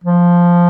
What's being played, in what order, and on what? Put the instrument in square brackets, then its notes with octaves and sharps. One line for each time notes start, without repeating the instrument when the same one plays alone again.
[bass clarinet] F3